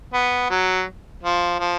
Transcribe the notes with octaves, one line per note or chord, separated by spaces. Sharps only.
B3
F#3
F3
F3